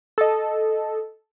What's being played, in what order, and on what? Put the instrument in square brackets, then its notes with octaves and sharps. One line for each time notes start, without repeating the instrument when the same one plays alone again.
[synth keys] A4 D#5